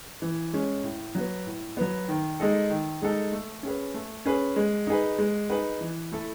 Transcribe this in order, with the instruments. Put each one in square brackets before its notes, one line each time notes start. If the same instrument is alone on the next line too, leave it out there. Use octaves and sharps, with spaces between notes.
[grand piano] E3
G#3 C#4
A2
F#3 B3
A2
F#3 B3
D#3
G#3 D#4 A4
D#3
G#3 D#4 A4
A3
C#4 G#4 B4
A3
C#4 G#4 B4
G#3
D#4 G#4 B4
G#3
D#4 G#4 B4
E3
A3 E4 A4